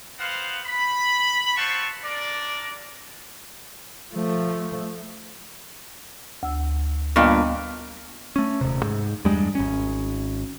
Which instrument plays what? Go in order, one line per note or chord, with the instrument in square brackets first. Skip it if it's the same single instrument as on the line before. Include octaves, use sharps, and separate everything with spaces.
[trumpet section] B3 C4 C5 F5 F#5
B5
C4 F4 F#5 A5 C#6
D4 A#4 D5
[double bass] F3 A3
[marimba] D2 E6
[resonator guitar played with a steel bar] G2 A#2 [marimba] B3 D#5 G5
[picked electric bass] A3 C#4
D#1 C3
G#2
E2 G2 G3 G#3
G#1 C#4